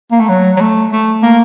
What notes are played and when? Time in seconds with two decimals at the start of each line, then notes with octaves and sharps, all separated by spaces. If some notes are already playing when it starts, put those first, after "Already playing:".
0.12 A#3
0.20 A3
0.29 F#3
0.56 F#3
0.60 A3
0.92 A3
1.23 A#3